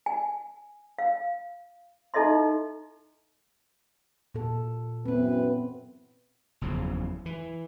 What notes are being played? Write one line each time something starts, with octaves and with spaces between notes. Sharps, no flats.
G#5
F5
D#4 E4 A4 D#5 E5 C6
A#2 A4
F#2 E3 B3 C4 B4
F#1 E2 C#3 F3
E3